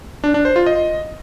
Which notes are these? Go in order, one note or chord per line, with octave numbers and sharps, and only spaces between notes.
D4
D4
C5
F4
D#5